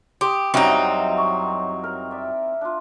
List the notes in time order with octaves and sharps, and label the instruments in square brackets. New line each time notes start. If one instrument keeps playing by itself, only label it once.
[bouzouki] G4 [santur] C6 D#6
[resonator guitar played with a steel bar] F#2 F#3 G3 [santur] A#3 E4 [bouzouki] C4 D#4
[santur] C#6
A#4
D5 E5
D4 F4